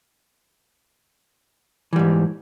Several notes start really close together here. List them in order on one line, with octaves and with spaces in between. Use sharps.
E3 G3 G#2